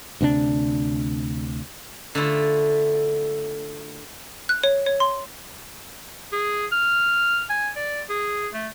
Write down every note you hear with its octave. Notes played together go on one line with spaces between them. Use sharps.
D2 C3 A#3 D4
D3 A3 E4 F4
F#6
C#5
C#5
C6
G#4
F6
G#5
D5
G#4
A3